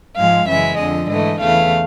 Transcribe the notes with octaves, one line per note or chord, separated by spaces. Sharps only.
G#2 F3 G#3 F5
F#2 C#3 E3 G#3 E5
F2 D3 F3 D#5
G#2 E3 A3 D#5
E2 C#3 E3 A3 F5